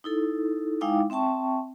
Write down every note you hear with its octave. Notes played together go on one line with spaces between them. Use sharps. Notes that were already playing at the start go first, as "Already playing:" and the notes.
D#4 E4 A4
G#3 D#4 E4 F5 G5 D6
C4 E5 G5 A5 C#6